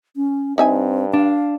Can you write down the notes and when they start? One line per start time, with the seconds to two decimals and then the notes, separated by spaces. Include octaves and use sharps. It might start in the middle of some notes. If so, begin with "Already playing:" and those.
0.16 C#4
0.58 G2 C4 D#4 E5 G#5
1.14 D4 F5